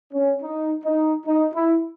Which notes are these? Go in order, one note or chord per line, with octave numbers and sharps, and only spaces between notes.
C#4
D#4
D#4
D#4
E4